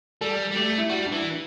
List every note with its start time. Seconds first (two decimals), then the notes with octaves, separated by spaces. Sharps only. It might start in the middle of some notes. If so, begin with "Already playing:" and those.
0.21 G3 A4
0.52 G3
0.55 A3 G4
0.78 E4
0.90 G3 F#4
1.06 D4
1.13 E3 E4